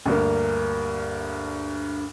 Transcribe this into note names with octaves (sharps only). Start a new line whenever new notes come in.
D2 G2 A#3